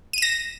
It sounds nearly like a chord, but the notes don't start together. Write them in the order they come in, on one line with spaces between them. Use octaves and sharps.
D#7 E7 A#6